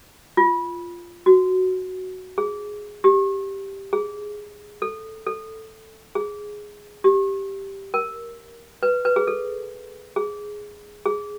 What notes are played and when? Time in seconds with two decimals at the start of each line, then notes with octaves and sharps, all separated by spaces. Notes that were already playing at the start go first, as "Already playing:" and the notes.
0.37 F4
1.26 F#4
2.38 G#4
3.04 G4
3.93 G#4
4.82 A4
5.27 A4
6.15 G#4
7.04 G4
7.94 A#4
8.83 B4
9.05 B4
9.16 G#4
9.27 A4
10.16 G#4
11.06 G#4